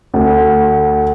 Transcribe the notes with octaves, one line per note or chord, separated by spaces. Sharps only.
D2